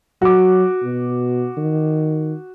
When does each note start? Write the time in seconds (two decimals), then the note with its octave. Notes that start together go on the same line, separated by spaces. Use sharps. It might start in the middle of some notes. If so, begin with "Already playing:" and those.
0.22 F#3 F#4 D6
0.83 B2
1.58 D#3